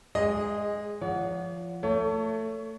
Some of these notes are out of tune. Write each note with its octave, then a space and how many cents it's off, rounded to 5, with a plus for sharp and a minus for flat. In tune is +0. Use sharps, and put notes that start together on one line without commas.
G#3 +0 G#4 -25 D#5 +0
F3 -15 C#5 +40 F#5 -5
A3 +20 C#5 +25